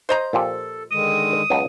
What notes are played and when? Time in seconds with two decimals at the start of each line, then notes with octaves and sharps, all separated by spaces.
0.09 C5 D#5 A#5
0.33 A#2 F3 G4 A4
0.92 D3 D#3 G#3 D#6
1.50 C#2 B2 F#3